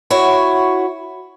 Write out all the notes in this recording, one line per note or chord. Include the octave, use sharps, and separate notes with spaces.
E4 F#4 C#5